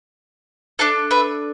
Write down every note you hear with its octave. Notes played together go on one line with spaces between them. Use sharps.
D4 A4 E5 A5
B4 E5